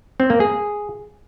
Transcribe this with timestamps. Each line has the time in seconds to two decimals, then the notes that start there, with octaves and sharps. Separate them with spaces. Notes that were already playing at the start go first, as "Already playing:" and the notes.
0.20 C4
0.30 A#3
0.40 G#4